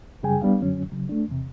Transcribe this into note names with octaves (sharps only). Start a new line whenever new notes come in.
F#2 C#3 G3 G#4 G5 G#5
G3 B3 D4 F5
F#2 D3 F#3 C#4
C#3 F#3
A3 D4
E2 C3